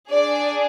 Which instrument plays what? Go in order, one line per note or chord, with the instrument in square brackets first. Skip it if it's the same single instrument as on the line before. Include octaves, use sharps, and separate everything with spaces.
[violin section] D4 G#4 D5